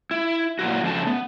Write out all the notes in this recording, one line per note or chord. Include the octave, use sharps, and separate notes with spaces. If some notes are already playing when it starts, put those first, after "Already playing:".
E4
A#2 F#3 E4 F#4
F2 C#3 A3 A5
B3